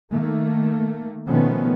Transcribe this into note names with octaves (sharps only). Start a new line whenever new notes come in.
D#3 A3 A#3
B2 D#3 F3 A3 B3 C#4